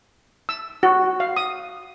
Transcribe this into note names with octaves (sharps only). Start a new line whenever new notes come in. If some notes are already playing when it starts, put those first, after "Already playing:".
E6
F#4
F5
D#6